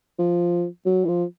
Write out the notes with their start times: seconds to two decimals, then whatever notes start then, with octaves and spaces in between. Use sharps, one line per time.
0.19 F3
0.86 F#3
1.05 E3
1.08 F3